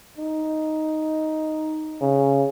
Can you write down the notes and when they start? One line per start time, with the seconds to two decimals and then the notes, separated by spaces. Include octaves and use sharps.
0.18 D#4
2.01 C#3